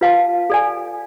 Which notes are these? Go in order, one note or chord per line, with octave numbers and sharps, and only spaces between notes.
F4 B4 F5 A5
A4 D5 G#5